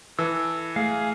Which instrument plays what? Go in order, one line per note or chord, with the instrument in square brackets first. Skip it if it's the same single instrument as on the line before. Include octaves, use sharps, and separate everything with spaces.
[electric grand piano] E3 [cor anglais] A4 [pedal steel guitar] E6
[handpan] A3 [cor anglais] G#4 [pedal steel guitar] F5